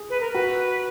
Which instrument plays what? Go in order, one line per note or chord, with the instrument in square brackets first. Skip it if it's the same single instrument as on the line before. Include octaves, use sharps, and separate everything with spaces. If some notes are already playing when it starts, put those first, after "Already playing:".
Already playing: [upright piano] G#4
[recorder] B4
A#4
[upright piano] F#4 [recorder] B4